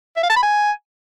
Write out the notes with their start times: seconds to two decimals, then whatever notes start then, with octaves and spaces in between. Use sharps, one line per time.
0.16 E5
0.23 F5
0.30 A5
0.36 B5
0.43 G#5